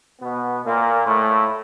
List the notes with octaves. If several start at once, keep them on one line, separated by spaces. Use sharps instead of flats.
B2 B3
A#2 A#3
A2 A3